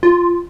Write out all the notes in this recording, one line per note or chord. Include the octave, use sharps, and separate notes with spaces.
F4